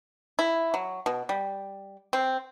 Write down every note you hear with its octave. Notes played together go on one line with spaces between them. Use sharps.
E4
F#3
B2
G3
C4